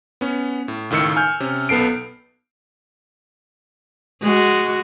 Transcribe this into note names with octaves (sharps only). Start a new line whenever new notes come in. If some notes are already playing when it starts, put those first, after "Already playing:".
B3 C#4
A2
C#2 A2 D#3 E6 C#7
G#5 F6 G6
C3 C#4
B1 B3 A4 C7 D7
G#3 F#4